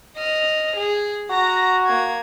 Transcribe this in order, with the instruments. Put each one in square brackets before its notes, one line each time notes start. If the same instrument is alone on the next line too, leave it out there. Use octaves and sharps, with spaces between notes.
[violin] D#5 F6
G#4
[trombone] F#4 [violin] A#5 A#6
[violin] A#3 G#6